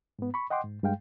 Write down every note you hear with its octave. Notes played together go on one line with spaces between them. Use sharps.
G#2 B3
B5 C#6
D#5 F#5 G5 C6 D6
G#2
G2 G#3 F5 G5